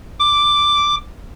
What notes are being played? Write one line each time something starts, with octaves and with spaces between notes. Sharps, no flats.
D6